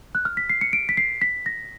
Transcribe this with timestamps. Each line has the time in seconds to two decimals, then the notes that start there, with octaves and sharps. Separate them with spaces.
0.15 F#6
0.25 F6
0.37 B6
0.49 C7
0.61 C#7
0.73 D7
0.89 B6
0.97 C7
1.22 B6
1.46 A#6